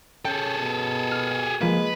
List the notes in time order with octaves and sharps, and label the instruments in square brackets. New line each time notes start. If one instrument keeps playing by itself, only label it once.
[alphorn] C#4 [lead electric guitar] G#4 A4 [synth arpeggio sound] G5 G6
[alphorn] B2
[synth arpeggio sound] F6
[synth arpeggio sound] F3 A#3 [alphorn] G#3 [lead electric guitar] B4